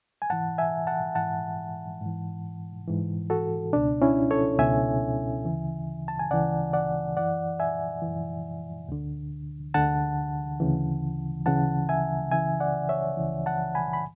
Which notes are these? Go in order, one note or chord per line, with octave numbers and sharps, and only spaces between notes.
G#5
G#2 E3 F#5 A5
E5 G#5
F#5 A5
G#2 E3 F#5 A5
G#2 E3
G#2 E3
F#4 A4
C#2 B2 D4
C#4 E4
A4 C#5
C#2 B2 E5 G#5
D2 C#3 E3
A5
G#5
D2 C#3 E3 D5 F#5
D5 F#5
F#2 E3 D5 F#5
E5 G#5
F#2 E3
D2 D3
D2 D3 F#5 A5
D2 C#3 E3
D2 C#3 E3 F#5 A5
E5 G#5
C#2 C#3 E3 E5 G#5
D5 F#5
C#5 E5
C#2 C#3 E3
F#5 A5
G#5 B5
B5